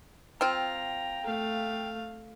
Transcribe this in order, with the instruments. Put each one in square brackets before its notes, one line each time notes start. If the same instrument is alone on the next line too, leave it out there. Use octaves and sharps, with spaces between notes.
[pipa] C4 F4 [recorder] G5 [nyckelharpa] A#5
[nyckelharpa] A3 F5